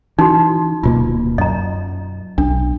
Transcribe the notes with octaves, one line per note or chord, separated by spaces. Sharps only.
E3 D#4 F#4
D1 B2 A#3 F4
F#2 D#5 A#5
B1 D4